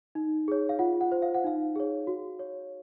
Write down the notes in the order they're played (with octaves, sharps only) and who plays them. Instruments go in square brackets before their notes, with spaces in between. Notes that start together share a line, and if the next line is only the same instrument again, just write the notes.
[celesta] D#4
G#4 C#5
F5
F4 F#5
F#5
C5
F5
F#5
D#4 F5
G#4 C#5
F#4
C#5